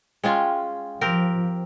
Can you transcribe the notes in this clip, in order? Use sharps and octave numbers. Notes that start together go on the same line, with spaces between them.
G#3 C#4 F4 G5
F3 C4 G4 A#4